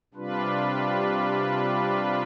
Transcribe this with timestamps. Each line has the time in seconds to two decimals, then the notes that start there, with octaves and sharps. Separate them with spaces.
0.14 C3 G3 D4 F4 B4